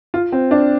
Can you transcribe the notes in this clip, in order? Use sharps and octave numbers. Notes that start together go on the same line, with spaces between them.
F4
C4
D4